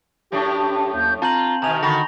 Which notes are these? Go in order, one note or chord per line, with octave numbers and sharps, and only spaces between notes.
F#2 A2 D4 G4
D#2 G6
C4 F4 A5 A#5 G6 F#7
B2 D#3 G#5 A#5 F7
D3 D#3 F#4 B5 C#6 A#6